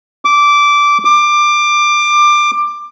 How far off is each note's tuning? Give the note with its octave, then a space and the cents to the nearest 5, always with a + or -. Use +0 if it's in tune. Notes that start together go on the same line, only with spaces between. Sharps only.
D6 -10
D6 +20